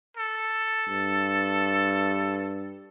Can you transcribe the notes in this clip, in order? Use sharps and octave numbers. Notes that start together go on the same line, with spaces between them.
A4
G2